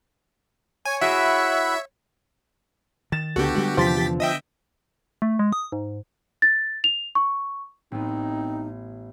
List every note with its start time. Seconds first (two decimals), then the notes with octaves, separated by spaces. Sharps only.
0.85 C#5 G#5
1.01 E4 F#4 G#4 E5 F#5 B5
3.12 D#3 A6 E7
3.36 C#2 D3 B3 F#4 G4 A4
3.56 G3 G#3
3.77 E2 C3 E3 F3 G4 A6 B6
4.20 D#5 E5 G5
5.22 A3
5.39 G#3
5.53 D#6
5.72 G#2
6.42 A6
6.84 F7
7.15 C#6
7.92 A1 B3 C4 D#4